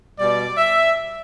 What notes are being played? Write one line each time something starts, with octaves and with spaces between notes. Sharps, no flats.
B2 G3 D5
E5